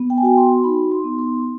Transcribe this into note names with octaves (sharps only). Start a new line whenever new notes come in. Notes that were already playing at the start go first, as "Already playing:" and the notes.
Already playing: B3
G5
G#5
F#4 G5
C6
D#4 B5
C6
B3
C6